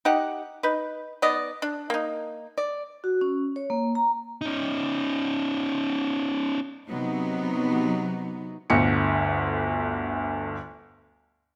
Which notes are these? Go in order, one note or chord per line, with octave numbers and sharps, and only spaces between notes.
D#4 G4 F#5
D#4 B4
B3 D#4 D5 D#5
D4
A#3 D#4
D5
F#4
C#4
C#5
A#3
A#5
C#4 D#4
C3 F#3 B3 D#4
G1 D2 C#7